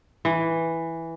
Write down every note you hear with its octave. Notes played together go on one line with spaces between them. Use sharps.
E3